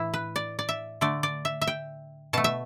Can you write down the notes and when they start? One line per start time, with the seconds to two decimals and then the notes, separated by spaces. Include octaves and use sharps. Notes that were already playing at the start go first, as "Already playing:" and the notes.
Already playing: A2 E3 E4
0.14 B4
0.36 D5
0.59 D5
0.69 E5
1.01 D3 A3 D5
1.23 D5
1.45 E5
1.61 E5
1.67 G5
2.33 B2 A3 A5
2.44 E5